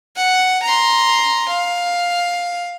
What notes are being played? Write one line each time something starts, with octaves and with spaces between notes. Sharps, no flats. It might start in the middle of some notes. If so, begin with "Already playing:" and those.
F#5
A#5 C6
F5